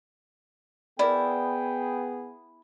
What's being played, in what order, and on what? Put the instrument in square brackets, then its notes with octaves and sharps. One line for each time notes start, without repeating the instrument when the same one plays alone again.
[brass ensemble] B3 G#4 [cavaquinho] E4 [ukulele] A#4 D5 [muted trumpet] G5